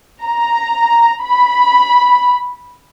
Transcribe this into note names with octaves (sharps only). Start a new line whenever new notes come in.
A#5
B5